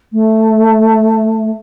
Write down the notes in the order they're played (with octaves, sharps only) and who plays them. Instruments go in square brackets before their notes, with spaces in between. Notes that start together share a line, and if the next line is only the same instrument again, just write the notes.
[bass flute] A3